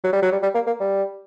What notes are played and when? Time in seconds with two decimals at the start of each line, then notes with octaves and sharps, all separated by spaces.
0.04 F#3
0.13 G3
0.22 F#3
0.32 G3
0.43 G3
0.55 A#3
0.67 A#3
0.80 G3